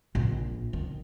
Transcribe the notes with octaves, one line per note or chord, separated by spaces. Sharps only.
A#1
D#3